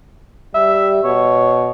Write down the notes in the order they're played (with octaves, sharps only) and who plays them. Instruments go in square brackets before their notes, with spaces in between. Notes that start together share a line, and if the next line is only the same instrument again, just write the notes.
[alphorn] G3 [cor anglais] E5
[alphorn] B2 [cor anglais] C#5